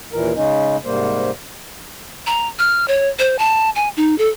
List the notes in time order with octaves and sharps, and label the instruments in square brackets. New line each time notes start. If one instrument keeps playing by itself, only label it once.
[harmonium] D#2 A#2 E3 A#4
C#3 G#3 C#4 D#4
G#2 C3 G3 A#3 C5
[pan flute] A#5
F6
C#5
C5
A5
G#5
D#4
A4